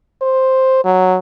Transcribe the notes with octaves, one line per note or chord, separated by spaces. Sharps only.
C5
F#3